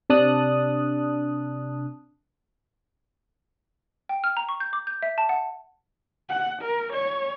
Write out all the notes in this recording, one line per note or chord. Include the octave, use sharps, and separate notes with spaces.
C3 D4 A5 D#6 F#6
G5
F6
A#5
C#6
G6
D6
G6
E5
A5
F#5
F#5
A#4
C#5